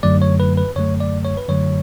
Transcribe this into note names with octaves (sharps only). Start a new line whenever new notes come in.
F#2 D3 F#3 A3 D5
C#5
B4
B4
F#2 D3 F#3 A3 C#5
D5
C#5
B4
F#2 D3 F#3 A3 C#5